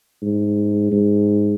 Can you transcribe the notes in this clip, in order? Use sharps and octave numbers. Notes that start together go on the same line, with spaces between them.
G#2
G#2